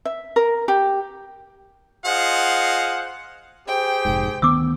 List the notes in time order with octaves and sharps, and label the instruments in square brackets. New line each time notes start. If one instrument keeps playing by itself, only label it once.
[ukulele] E5
A#4
G4
[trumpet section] F4 G#4 C5 D#5 F5 F#5
[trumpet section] G4 G#4 C5 [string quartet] G5
[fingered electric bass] F1 G#2
[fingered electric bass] D2 D#3 B3 [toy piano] D6 E6